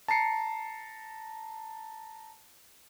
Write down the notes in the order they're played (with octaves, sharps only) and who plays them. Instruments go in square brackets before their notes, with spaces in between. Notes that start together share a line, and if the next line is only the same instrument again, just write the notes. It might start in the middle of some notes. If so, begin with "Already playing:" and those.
[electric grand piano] A5 A#5 C7 C#7